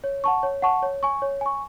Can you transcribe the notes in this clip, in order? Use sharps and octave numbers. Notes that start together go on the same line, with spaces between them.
C#5
F#5 A5 C#6
C#5
F#5 A5 C#6
C#5
G#5 C#6
C#5
G#5 C#6